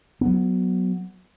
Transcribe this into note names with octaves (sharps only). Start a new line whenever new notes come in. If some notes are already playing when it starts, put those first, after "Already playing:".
F#3 B3